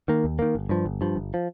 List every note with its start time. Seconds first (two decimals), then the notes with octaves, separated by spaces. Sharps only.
0.08 D#3 A#3
0.24 D#2
0.39 D#3 A#3
0.55 G1
0.69 G2 F3
0.85 G1
1.01 G2 F3
1.16 G1
1.34 F3